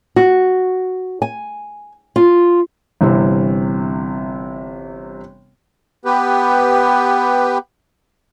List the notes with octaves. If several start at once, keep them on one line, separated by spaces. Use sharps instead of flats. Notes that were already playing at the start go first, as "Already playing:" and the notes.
F#4
G#5
F4
G1 C3 E3 C4
B3 G4 B4